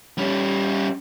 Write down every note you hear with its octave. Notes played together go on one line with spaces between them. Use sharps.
G3 C#4